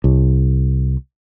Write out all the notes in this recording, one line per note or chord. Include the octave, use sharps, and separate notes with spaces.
C2